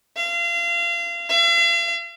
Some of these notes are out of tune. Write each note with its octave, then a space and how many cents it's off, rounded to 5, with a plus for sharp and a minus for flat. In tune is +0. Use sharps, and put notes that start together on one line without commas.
F5 -30
F5 -45